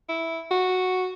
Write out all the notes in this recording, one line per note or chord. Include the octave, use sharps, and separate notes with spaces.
E4
F#4